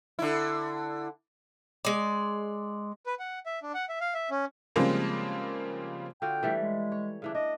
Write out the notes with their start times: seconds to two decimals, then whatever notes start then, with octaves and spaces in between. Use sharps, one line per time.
0.19 D3 E4
1.85 G#3 D5
3.06 B4
3.19 F#5
3.46 E5
3.63 D4
3.74 F#5
3.89 E5
4.01 F5
4.14 E5
4.30 C#4
4.76 C#3 F3 G3 G#3 A#3 C4
6.22 D3 F4 F#4 G5
6.43 E3 G3 A3
6.60 G#3
6.92 C#5
7.22 C#3 E3 D4
7.35 D4 D#5